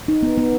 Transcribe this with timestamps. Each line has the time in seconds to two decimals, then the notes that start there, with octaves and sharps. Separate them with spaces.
0.08 D#4
0.23 B3
0.38 B3